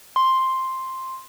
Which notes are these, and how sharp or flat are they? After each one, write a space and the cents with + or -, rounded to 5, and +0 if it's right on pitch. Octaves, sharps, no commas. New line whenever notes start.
C6 +5